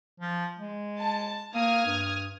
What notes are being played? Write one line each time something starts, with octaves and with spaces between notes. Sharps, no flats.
F3
G#3
A5
A#3 D#6 F6 G#6
G2